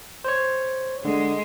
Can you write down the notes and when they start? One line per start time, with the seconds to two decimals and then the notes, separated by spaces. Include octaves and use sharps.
0.24 C5 C#5
1.05 D3 G#3